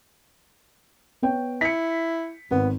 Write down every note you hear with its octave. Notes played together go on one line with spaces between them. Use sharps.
B3 C#5 G5
E4 B6 C#7
G#1 B3